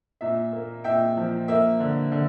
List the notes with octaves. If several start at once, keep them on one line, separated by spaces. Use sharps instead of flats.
A#2 E5
A#3
A#2 E5 G5
F3
A#3 E5
D3
D3